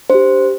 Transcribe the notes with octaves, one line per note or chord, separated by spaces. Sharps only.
D4 G4 C5